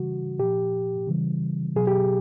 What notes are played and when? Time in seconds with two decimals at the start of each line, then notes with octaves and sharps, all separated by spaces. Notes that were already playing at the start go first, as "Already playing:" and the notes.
Already playing: C#3 E3 G3 F#4
0.39 A#2 F3 G4
1.07 C#3 E3 G3
1.76 B2 F#3 G#4
1.87 G4